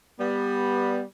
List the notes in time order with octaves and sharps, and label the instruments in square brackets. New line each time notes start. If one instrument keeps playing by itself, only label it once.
[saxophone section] G3 B3